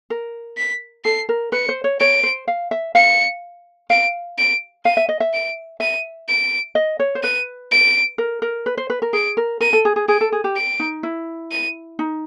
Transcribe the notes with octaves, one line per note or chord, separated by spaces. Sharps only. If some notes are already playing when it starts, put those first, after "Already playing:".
A#4
B6
A4 C7
A#4
B4 C#7
C5
C#5
C#5 D7
C5
F5
E5
F5 C#7
F5 D7
D7
F5 D#7
E5
D#5
E5
D7
E5 D#7
D7
D#5
C#5
C5
B4 D#7
D7
A#4
A#4
B4
C5
B4
A#4
G#4 D7
A#4
A#4 D#7
A4
G#4
G#4
G#4 D7
A4
G#4
G4
D7
D#4
E4
D#7
D#4